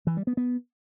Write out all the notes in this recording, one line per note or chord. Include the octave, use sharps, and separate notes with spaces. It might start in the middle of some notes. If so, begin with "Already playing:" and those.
E3
G3
B3
B3